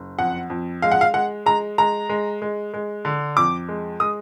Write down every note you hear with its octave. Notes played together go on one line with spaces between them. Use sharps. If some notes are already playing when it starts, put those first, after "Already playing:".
Already playing: F#1
F2 F#5
F2
G#3 F5
F#5
F5
G#3 F#5
G#3 A#5
G#3 A#5
G#3
G#3
G#3
D3
F2 D6
G#3
G#3 D#6